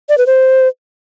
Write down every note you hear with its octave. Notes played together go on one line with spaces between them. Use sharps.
D5
B4
C5